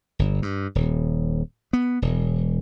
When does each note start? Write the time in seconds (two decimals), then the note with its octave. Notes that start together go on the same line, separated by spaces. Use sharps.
0.19 G1
0.42 G2
0.75 D#1
1.73 B3
2.02 E1